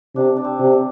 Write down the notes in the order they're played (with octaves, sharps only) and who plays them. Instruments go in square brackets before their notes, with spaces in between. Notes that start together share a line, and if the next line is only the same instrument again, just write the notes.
[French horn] C3 [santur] D4
[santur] D4
C4
[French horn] C3
[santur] D4